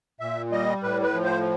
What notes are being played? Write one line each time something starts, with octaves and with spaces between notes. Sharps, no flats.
A#2 E5
G3 D#5
A2 B4
B4
F3
C5